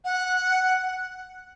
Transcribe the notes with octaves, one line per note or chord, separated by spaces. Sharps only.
F#5